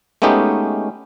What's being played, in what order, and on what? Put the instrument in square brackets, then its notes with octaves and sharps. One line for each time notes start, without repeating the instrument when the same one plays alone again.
[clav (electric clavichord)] G#3 A3 B3 C#4 D#4 G4